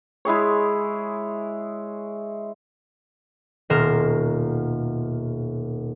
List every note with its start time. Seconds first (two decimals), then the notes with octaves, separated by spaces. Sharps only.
0.25 G#3 E4 G#4 C#5
3.70 D#1 B2 A#4 C6 E7